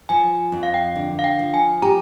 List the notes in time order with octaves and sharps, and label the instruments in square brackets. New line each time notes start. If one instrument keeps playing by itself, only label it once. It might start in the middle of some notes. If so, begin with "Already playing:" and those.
[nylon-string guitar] F3 [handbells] G#5
[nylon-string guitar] F2
[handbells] F5
G5
[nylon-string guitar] D3
[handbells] F5
G5
[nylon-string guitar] F3
[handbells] G#5
[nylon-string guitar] G4 [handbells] A#5